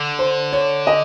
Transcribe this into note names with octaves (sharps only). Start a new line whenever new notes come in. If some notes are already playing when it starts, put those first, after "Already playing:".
Already playing: D3
C5
C#5
D#5